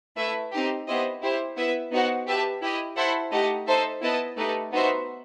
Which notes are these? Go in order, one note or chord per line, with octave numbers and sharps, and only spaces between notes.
A3 E4 B4 E5
C4 D#4 G4
B3 E4 G4 C5 D#5
E4 G4 C5
B3 E4 B4 E5
B3 D#4 F#4 C5 F#5
G4 B4 E5 A5
E4 G4 D#5
E4 A4 C5 F#5
A3 D#4 G4 D#5 F#5
D#4 A4 C5 E5
B3 E4 B4 D#5 A5
A3 D#4 G4 B4
B3 D#4 F#4 C5 E5